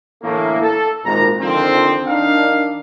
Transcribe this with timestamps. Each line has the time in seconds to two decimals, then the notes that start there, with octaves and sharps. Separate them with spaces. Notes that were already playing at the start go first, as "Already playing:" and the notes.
0.23 A2 D3 E3 A3 A#3
0.62 A4
1.05 G#1 A#2 A#5
1.41 F2 D3 D#3 F3 C4
2.08 D#3 D4 D#4 F5